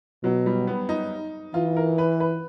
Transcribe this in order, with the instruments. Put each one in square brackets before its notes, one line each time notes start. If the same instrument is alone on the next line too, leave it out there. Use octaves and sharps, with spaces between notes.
[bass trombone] B2 [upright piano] F#3
[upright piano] G3
B3
D#4
[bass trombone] E3 [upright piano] F4
[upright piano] A#4
B4
B4